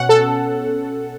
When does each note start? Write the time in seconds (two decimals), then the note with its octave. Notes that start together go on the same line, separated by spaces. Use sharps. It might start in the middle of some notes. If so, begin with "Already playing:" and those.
Already playing: B2 C#4 F#5
0.09 A4